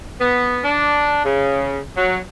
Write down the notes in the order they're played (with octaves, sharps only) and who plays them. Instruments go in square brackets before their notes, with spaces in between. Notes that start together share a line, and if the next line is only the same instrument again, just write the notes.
[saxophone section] B3
D4
C#3
F#3